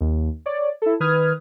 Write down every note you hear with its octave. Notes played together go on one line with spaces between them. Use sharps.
D#2
C#5 D5
E4 A4
D#3 B4 D#6 F6 G#6